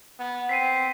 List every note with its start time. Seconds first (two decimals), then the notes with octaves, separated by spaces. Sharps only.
0.19 B3
0.49 C4 B6 C7 D#7